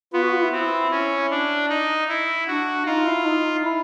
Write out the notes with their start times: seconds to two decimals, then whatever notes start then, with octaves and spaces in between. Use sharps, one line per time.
0.13 B3 F4
0.22 F#4
0.32 F4
0.43 E4
0.52 C4
0.91 C#4
1.30 D4
1.69 D#4
2.08 E4
2.48 D4 F#4
2.86 D#4 F4
3.06 E4
3.25 D#4
3.65 E4